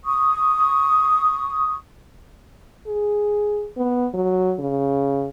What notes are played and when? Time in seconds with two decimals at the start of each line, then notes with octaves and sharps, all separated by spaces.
0.05 C#6 D#6
2.87 G#4
3.77 B3
4.14 F#3
4.59 C#3